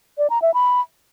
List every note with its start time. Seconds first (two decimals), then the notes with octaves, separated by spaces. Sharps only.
0.18 D5
0.30 A#5
0.42 E5
0.54 B5